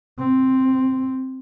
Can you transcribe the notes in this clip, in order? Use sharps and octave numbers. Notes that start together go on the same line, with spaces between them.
C4